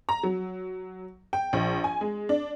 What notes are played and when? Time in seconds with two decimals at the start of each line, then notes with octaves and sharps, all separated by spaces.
0.09 A#5
0.23 F#3
1.33 G5
1.53 A#1
1.84 G#5
2.01 G#3
2.29 D4